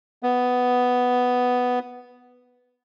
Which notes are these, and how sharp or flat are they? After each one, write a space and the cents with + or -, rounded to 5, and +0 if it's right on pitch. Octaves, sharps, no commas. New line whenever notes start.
B3 +5